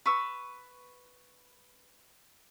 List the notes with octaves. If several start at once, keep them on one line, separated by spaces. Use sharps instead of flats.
B4 C#6 E6